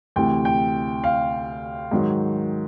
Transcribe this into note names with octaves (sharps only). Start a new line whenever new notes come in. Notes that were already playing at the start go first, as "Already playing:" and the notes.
D2 C3 E3 G5
G5
F5
G#2 D#3 F#3